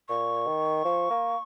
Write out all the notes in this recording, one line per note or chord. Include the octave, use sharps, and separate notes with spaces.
A#2 C#6
D#3
F3
A#3